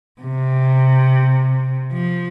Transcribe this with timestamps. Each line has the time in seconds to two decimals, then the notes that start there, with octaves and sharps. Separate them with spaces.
0.21 C3
1.93 F3